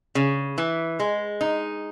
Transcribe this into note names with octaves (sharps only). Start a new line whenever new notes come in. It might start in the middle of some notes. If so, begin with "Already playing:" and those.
C#3
E3
G#3
D#4